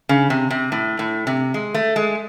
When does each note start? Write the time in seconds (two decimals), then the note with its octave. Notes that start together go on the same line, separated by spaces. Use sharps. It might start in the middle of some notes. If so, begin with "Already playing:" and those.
0.09 C#3
0.30 C3
0.50 C3
0.72 A2
0.99 A2
1.27 C3
1.54 G#3
1.74 A3
1.96 G#3